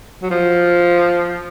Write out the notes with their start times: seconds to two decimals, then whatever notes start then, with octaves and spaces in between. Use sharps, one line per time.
0.22 F#3
0.31 F3